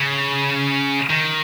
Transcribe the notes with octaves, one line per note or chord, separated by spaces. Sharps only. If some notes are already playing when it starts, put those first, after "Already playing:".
Already playing: C#3
D#3